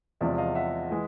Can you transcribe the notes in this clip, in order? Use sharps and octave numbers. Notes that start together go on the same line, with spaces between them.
E2 C3 F3 G#3 D5 E5
D#5 F5
E5 F#5
E3 G#3